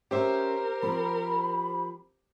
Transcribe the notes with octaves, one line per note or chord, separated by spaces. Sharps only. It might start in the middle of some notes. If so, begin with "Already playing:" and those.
C#4 G4 A#4 C5 E5
F3 C4 B5